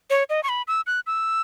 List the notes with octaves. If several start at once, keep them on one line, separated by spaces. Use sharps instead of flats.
C#5
D#5
C#6
B5
E6
F#6
E6